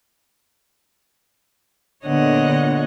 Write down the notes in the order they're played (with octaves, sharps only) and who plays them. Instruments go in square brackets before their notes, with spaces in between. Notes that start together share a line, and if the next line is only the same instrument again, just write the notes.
[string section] A#2 D3 B3 [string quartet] C#5 D#5 F#5